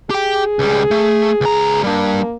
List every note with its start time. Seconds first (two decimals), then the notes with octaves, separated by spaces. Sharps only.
0.10 G4 G#4 G5
0.59 C#2 G3
0.91 A3
1.41 C#2 A#5
1.84 G3 A#3 D4